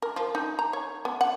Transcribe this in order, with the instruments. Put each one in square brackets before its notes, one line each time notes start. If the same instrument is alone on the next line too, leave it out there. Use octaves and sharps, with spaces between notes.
[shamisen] A#4
F3
D#4
A#5
C#5
B3
F#5